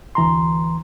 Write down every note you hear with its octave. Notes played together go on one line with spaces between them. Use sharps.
D2 E3 A#5 C6